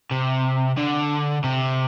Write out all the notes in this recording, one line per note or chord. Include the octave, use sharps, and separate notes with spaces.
C3
D3
C3